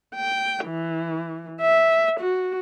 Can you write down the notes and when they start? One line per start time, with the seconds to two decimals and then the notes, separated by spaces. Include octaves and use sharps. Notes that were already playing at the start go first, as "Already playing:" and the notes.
0.15 G5
0.66 E3
1.61 E5
2.20 F#4